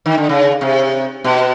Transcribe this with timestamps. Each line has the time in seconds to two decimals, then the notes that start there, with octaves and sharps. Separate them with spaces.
0.06 D#3
0.18 D3
0.29 C#3
0.61 C3
1.24 B2